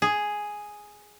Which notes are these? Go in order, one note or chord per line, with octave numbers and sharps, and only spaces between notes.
G#4